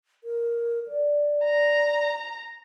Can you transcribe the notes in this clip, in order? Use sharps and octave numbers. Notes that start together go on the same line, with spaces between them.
A#4
D5
A#5